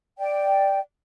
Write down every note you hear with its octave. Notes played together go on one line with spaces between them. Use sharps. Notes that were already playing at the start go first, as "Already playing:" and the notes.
D5 G5